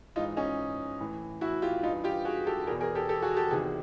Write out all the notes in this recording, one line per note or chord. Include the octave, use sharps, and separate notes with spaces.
G#2 E3 D#4 F4
C#4 D#4
A2 E3
E4 F#4
F4 G4
G2 E3 D#4 F4
F4 G4
F#4 G#4
G4 A4
E2 B2 G#4 A#4
G#4 A#4
G4 A4
G4 A4
F#4 G#4
G4 A4
E2 C3 D#3 F#4 G#4